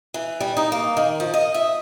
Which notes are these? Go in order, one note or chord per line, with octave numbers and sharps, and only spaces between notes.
E3
G3
D#4
A#3
D#3
F3
D#5
E5